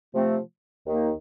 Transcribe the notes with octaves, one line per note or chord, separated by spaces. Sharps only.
C3 F3 A3 C4
D#2 D#3 A#3 D#4